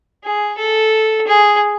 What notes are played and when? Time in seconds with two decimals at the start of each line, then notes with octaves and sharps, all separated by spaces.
0.24 G#4
0.59 A4
1.27 G#4